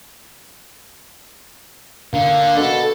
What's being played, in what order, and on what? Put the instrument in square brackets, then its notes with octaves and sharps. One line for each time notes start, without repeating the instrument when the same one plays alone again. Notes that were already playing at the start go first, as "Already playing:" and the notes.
[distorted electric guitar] D3 [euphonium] A#3
[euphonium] B2 [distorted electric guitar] A4